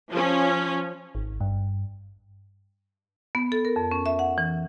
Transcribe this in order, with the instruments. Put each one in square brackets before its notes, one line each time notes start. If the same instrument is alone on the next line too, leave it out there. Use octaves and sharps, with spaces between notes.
[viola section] F3 C#4
[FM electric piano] G#1
G2
[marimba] B3
A4
A#4
F2
C#4
E5
F#5
E3